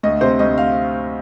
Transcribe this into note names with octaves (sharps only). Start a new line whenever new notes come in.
D2 D#5
C3 C5
D2 D#5
F5